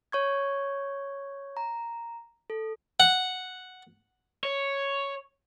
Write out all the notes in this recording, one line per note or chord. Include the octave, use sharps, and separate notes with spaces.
C#5 C#6 G#6
A#5
A4
F#5
C#5